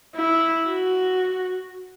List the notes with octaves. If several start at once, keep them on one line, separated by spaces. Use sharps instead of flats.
E4
F#4